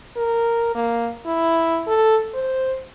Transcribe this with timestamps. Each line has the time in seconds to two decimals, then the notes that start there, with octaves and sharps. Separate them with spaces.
0.17 A#4
0.75 A#3
1.26 E4
1.87 A4
2.34 C5